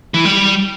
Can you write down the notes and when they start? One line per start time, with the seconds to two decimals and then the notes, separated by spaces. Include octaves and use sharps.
0.14 E3
0.25 G3